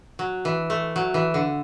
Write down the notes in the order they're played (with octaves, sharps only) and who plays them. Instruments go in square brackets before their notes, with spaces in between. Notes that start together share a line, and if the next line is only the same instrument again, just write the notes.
[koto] F#3
E3
A3
F#3
E3
D3